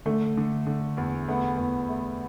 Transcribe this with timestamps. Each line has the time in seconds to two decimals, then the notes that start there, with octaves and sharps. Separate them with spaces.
0.06 D3 A3
0.37 D3
0.66 D3
0.97 E2
1.28 A3 B3
1.58 E2
1.89 A3